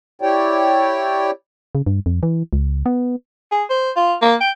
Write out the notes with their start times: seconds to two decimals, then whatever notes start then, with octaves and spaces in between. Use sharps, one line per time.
0.22 E4 G4 C#5 D5 G5
1.75 C#3
1.86 G2
2.06 F2
2.23 E3
2.53 C#2
2.86 B3
3.52 G#4
3.70 C5
3.96 F4
4.22 A#3
4.41 G5